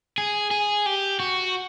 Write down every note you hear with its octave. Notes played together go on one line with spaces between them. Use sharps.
G#4
G#4
G4
F#4